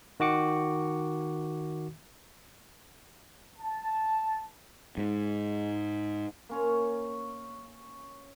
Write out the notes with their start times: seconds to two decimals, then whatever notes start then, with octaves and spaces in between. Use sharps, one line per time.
0.20 D#3 F#4 D6 C#7
3.59 A5
4.97 G#2
6.49 A#3 C#4 C#5